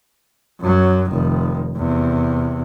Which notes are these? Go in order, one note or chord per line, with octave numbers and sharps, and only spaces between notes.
F#2 F#3
F1 D#3
E2 C3